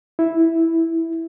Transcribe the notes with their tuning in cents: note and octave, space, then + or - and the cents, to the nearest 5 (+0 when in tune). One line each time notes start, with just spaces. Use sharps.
E4 -5